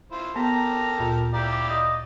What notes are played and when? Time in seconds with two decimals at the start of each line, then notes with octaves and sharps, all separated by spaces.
0.12 E4 F4 C5
0.36 B3 G4 A4 A#4 A#5
0.99 D2 A#2 F4
1.34 E4 G4 D5 F5 A#5
1.53 D6
1.69 D#5